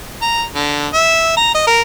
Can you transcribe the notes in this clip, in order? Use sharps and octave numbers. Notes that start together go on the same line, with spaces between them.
A#5
D3
E5
A#5
D#5
A#4